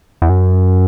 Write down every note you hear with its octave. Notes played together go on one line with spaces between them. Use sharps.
E2
F#2